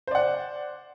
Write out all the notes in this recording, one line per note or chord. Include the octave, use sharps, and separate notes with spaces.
C5 D5 F#5